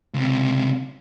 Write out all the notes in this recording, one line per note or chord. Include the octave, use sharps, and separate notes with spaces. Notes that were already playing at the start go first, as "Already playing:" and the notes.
C#2 C3